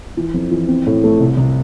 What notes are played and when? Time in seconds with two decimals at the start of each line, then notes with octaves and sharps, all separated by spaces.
0.17 E3
0.34 F2
0.51 E3
0.68 C4
0.87 A2
1.04 A3
1.20 C2
1.37 C2